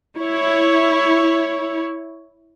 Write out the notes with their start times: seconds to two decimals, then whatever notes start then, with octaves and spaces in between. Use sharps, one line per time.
0.18 E4 C#5